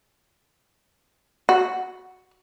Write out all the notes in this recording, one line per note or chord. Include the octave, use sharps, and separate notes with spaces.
F#4